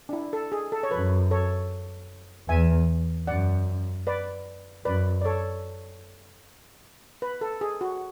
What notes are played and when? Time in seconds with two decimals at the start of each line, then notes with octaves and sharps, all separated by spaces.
0.09 D4
0.13 E4
0.33 A4
0.52 G#4
0.72 A4
0.83 C#5
0.91 F#2 B4
1.31 A4 C#5
2.49 E2 E5 G#5
3.27 F#2 D5 F#5
4.07 B4 D5
4.85 F#2 B4 D5
5.22 D5
5.25 A4 C#5
7.22 B4
7.41 A4
7.61 G#4
7.81 F#4